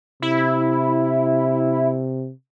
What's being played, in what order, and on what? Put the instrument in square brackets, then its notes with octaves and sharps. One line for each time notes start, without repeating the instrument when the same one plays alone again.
[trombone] C3 [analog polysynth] E4